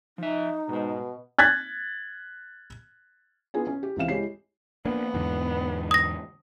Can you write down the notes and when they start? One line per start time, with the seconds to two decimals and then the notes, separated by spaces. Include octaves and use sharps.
0.18 F3 D#4 E5
0.69 G#2 B2 G#3
1.39 F#6 G#6 A6 B6
3.54 B3 D4 F4 G#4 G#5
3.67 C#4 G#5
3.83 G4
3.96 C#2 E3 C4 F5 E7
4.08 G#3 E4 G4 C#5 C7
4.85 A#3 B3 D4
5.14 E2 G#2 D3
5.91 D#6 A#6